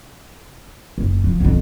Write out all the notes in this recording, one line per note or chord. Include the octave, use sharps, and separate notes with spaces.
F#1
F3
B1 F2